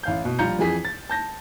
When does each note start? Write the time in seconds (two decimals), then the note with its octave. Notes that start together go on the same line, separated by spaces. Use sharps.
0.03 A1 F5 G6
0.25 B2
0.39 A#1 G3 F4 A#5 G6 C#7
0.58 F2 E3 G#4 B6
0.85 A6
1.09 A5 G6 A#6